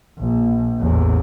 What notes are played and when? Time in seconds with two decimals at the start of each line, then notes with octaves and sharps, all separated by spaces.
0.18 A#1
0.79 A1 E2